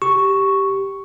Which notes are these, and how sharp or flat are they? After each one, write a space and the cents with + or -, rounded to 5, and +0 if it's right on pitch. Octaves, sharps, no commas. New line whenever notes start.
G4 -5 C#6 +0